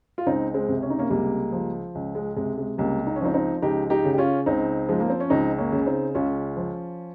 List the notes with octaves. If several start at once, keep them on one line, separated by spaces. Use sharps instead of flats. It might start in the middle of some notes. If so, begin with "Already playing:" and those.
F4
C#2 C4 D#4
G#3 C4
C3
C#4
D#4
A#3 C#4
C#2 G3 A#3
F3
C#2
G#3
C3 G#3
G#3
C#2 G3 A#3
D#4
C#4
F3 C4 D#4
C4 D#4
C#2 D#4 G4
D#4 G4
C#3
G4
C#4 F4
C#2 C4 D#4
F3 G#3
A#3
C4
C#4
C#2 C4 D#4
A#3 C#4
C#3
C4 D#4
C#2 C#4 F4
F3